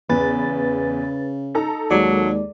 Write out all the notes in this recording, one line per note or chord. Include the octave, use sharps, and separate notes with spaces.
E2 C#3 B4 A6
D#4 A4 A#5
D#2 F#3 G#3 D5